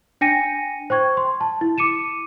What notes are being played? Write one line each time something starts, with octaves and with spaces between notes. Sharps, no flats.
D4 G5 G#5 A#6 C#7 D#7
C5 G5 C#6 G#6
C6
A5
E4
D6 C#7 D#7 E7